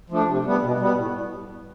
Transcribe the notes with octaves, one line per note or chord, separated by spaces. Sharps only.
F3 A3 D4
C3
G3 B3
B2
G3 B3
A2